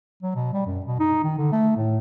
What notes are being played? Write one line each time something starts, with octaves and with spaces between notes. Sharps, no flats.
F#3
B2
G3
F#2
B2
D#4
D#3
D3
A3
A2